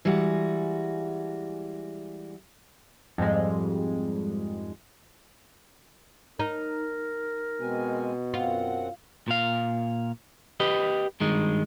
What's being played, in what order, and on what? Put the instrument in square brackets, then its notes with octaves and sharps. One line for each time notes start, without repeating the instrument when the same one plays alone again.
[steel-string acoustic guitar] E3 G3 G#3 F#4
[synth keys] F2 G#2 G3 G#3
[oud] D#4 [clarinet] A#4
[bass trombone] B2 [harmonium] G#3 C4 G#5
[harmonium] F#2 C4 F#5 [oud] F4
[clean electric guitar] A#2 F5
G4 B4 D#5
G2 D#3 G#3